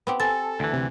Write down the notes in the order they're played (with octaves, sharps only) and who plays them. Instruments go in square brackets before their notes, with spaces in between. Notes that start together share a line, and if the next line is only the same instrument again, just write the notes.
[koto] B3 C4 G4
[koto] C4 [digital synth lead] A4 [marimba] G#5 A6
[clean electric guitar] D2 E3
[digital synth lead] C3